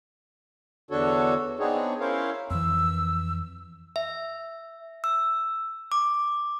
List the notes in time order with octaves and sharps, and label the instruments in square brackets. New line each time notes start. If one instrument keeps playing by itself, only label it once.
[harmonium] E2 D3 D4 F#4 A4 C#5
B3 C4 D4 D#4 G#4 C#5
C#4 E4 A#4 C5 C#5 F5
[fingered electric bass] F2 E3 [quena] E6
[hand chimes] E5
E6
D6